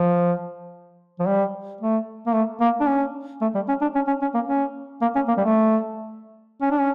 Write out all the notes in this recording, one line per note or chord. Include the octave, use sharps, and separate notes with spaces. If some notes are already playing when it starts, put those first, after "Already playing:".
Already playing: F3
F3
G3
A3
A#3
A3
A#3
D4
C#4
A3
G3
C#4
D4
C#4
C#4
C#4
A#3
C#4
A#3
C#4
A#3
G3
A3
C#4
D4
C#4